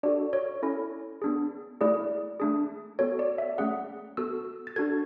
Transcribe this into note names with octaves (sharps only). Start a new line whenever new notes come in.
D4 F#4 A4 D5
C#5
C#4 E4 A4
B3 D4 G#4
A3 E4 G#4 D5
A3 D4 G#4
B3 F#4 A4 C#5
D5
E5
A3 C#4 G#4 F#5
B3 F#4 A4 E6
A6
D4 F#4 A4 G#6